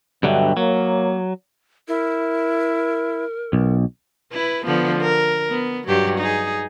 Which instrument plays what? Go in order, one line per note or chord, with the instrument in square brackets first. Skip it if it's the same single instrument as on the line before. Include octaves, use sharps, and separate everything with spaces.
[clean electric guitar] G2 D3 F#3 [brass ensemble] B2 E5 G5
[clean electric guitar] F#3 [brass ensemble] A#3 C#5
[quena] E4 [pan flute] A#4
[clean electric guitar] B1
[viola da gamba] E4 B4
D3 F3 B3
A#4
B3
G2 F#3 G4
D#4 G#4